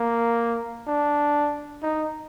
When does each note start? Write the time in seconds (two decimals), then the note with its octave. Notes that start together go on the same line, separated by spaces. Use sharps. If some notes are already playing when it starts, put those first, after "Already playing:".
Already playing: A#3
0.87 D4
1.83 D#4